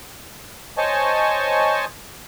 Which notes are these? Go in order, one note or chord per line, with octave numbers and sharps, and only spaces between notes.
C5 C#5 D#5 G#5 A5 C#6